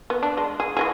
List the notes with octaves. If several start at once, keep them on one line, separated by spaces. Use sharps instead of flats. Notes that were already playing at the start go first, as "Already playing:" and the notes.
B3
D4
G#3
G#4
E3 F#3 G#4